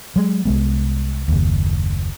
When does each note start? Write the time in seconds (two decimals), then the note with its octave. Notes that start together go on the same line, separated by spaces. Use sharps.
0.16 F#3 G#3
0.45 C2 G#3 B3
1.28 F#1 D#2